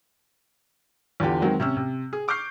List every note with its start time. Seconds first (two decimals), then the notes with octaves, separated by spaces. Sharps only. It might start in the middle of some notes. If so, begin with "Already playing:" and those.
1.20 E2 D3 F4 G4
1.42 D#3 F#3 G#3 C4
1.60 C3 C#4 E6
1.76 C3
2.13 G#4
2.28 C#6 D6 F6 G6 C7